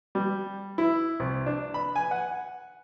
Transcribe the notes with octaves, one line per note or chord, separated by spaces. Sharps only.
G3
E4
C2
D4
B5
G#5
F#5